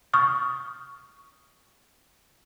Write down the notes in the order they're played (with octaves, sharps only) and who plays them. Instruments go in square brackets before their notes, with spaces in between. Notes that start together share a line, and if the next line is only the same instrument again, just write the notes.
[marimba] C#6 D#6 F6